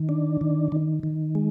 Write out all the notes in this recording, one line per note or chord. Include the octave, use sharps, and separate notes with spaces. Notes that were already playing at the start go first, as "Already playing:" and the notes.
Already playing: D#3
D4
D#3
D#3
D#3
G#3